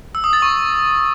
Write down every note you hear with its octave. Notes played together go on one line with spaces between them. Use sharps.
E6
D#6
A6
C#6